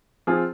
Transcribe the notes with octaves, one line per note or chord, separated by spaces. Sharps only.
F3 C4 F4 G#4